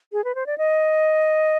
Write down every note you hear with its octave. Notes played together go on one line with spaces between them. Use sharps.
G#4
B4
C5
D5
D#5